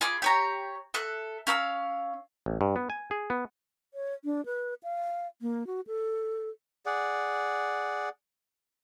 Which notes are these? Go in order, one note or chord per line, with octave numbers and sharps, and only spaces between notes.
F4 G#4 B5 D6
G4 C#5 A#5
A4 E5 F#6
C#4 F5 A#5 E6
A1
G2
B3
G#5
G#4
B3
C#5
D4
B4
F5
A#3
F#4
A4
G#4 D5 F#5